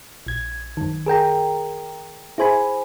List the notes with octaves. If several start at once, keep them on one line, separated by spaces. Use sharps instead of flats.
A#1 G#6
F#2 D#3
G#4 A#4 G5 A#5
E4 G#4 C5 G#5 B5